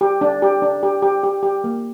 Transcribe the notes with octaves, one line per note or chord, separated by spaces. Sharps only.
G4
D4
G4
D4
G4
G4
G4
G4
A#3